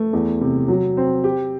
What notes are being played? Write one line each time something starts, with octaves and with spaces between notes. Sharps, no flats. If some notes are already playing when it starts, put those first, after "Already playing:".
Already playing: A3
E2
C3
F#3
C4
G4